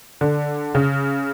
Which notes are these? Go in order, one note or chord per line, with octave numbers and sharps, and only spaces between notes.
D3
C#3